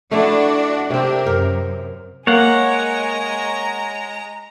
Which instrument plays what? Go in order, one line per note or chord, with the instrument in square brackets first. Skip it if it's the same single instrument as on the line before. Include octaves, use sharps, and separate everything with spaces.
[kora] A3 E4 [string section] D4 F#4
[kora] C3 C4 [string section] D4 G4 A#4
[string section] F#2 [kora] A#4
[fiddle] G#3 A#5 [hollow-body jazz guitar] A#3 [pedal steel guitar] C#5 F#5